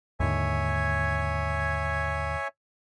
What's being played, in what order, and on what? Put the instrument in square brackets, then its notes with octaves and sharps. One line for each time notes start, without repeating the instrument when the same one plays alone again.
[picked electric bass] D#2 G#2 D3 [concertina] C#5 E5 G#5